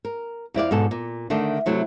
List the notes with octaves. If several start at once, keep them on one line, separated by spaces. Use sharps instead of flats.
A#4
F2 E4 D5 F5
G#2 B2 A4
A#2
D3 D#3 A3 D4
C3 F#3 A3 E4